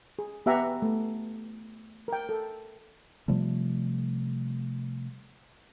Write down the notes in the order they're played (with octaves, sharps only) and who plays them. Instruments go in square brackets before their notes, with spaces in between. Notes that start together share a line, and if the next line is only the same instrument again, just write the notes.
[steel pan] G#4
B3 G4 E5 F#5 G#5 A#5
A3
A#4 G5
A4
[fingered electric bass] C3 F3 G3 A3